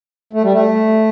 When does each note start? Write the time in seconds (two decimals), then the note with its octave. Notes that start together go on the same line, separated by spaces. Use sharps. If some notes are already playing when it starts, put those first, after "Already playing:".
0.33 A3
0.43 G3
0.53 A3